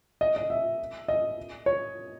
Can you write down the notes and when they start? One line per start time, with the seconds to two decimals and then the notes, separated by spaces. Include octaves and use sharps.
0.21 D#5
0.36 D#5
0.50 E5
1.08 D#5
1.66 C#5